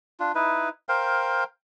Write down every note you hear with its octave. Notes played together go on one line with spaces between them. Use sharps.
D4 F4
D#4 E4 B4
A#4 C5 F5 G5